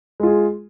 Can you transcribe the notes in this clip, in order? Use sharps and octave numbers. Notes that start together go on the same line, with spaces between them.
G#3 F4 G#4